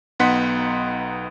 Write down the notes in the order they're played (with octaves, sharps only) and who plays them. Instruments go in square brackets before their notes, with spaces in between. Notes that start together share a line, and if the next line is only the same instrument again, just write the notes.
[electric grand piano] B1 B3 D#4 F#5 C6 B6